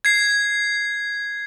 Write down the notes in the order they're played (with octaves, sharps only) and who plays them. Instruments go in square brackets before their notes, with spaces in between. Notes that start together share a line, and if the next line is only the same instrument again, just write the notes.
[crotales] G#6 C7